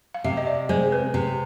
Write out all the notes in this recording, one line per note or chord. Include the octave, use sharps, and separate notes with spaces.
F5
C3 E5
D#5
D5
G#3 C5
B4
C3